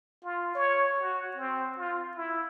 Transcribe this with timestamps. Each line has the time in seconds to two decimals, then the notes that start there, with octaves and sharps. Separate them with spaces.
0.23 F4
0.55 C#5
1.00 F#4
1.36 C4
1.78 F4
2.16 E4